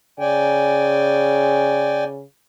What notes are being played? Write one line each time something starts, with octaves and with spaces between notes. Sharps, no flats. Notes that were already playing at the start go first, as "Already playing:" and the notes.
C#3 D5 G5 G#5